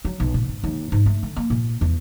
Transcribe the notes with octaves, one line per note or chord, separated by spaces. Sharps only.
F#3
B1
A#2
G#2
D#2
G#2
A3
D3
A#3
A#2
E2